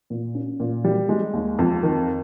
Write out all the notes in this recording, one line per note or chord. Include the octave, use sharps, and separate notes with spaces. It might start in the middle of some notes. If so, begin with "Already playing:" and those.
A#2
C#4
A#2
G3
G#3
D#2
F2
D#3